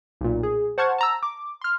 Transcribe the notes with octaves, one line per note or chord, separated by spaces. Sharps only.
B1 A#2
G#4
C5 F#5 A5 C#6 F6 G#6
A5 A#5 E6
D6
C6 F6